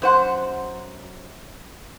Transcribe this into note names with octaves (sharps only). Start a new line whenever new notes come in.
F#2 C5 F#5